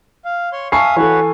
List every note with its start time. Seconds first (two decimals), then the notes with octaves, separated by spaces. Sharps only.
0.25 F5
0.53 C#5 C6
0.72 E5 F5 G#5 A5 C#6 D#6 C7
0.96 E3 F#4 A4 B4 C#5 C#6